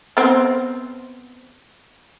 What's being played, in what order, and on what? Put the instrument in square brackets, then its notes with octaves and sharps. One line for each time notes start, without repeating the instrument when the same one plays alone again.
[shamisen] B3 C4 C5